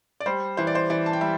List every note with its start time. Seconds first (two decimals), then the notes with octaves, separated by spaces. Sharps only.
0.20 D5
0.26 G3 C5
0.57 E3 C5
0.67 D5
0.75 C5
0.90 E3 D5
1.06 A5
1.13 G5
1.21 G3 E5